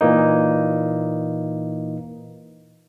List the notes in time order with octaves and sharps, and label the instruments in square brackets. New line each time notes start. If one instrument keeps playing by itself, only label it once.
[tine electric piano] A#2 E3 A#3 D#4